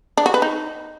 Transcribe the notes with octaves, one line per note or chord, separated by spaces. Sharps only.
D4
F#4
B4
D#4